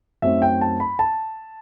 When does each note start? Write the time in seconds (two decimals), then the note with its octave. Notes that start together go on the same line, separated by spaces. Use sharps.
0.22 F#2 F#3 A3 C4 D#4 E5
0.42 G5
0.61 A5
0.80 B5
0.99 A5